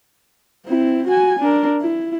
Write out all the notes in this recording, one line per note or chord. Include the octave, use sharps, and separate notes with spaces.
C4 E4
F#4 G#5
D4 A#4
E4